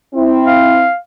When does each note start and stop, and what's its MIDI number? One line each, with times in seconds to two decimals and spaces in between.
0.14 0.85 60
0.14 0.85 64
0.47 0.95 77